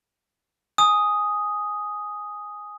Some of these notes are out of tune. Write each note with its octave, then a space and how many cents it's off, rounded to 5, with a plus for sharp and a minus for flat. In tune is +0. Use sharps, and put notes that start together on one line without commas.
G#5 +0 D#6 +0